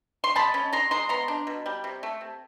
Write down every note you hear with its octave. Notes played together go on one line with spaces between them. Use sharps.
C6
G#3 A5 B5
C#4
G#3 A#5 C6
G#3 A#5 C6
B3 A#5 C6
D4
B2
G3
C3
A3
C3